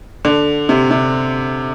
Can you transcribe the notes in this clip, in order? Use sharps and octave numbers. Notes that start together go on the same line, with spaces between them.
D3
C3
C3